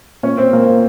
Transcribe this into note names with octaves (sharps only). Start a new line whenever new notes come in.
A#2 C#4
A#2 C4
A#2 A#3
A#2